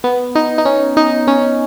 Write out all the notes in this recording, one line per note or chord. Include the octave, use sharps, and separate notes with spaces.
B3
D#4
D#4
C#4
D#4
C#4